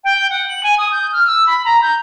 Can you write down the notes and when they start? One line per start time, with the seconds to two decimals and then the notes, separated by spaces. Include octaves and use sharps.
0.04 G5
0.30 F#5
0.48 F#7
0.63 G#5
0.78 D#6
0.91 G6
1.12 F6
1.26 E6
1.46 B5
1.65 A#5
1.82 G6